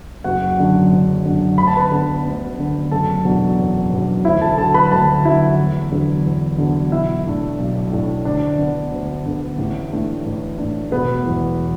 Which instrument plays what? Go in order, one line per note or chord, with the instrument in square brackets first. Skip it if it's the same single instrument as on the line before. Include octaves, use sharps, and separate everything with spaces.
[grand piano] F#1 F#4 F#5
F#2 D3 F#3
F#1
F#2 D3 F#3
D2 B5
A5
B4 B5
D3 B3
D2
D3 B3
F#1 A4 A5
E2 B2 F#3 D4
F#1
E2 B2 F#3 D4
D2 E4 E5
A4 A5
D3 F#3 A4 A5
B4 B5
D2 A4 A5
D3 F#3 E4 E5
E2
D3 F#3 B3
E2
D3 F#3 B3
B1 E4 E5
A2 A3 D4
B1
A2 A3 D4
D2 D4 D5
D3 B3
D2
D3 B3
A1
A2 A3 D4
A1
A2 A3 D4
E1 B3 B4
E2 E3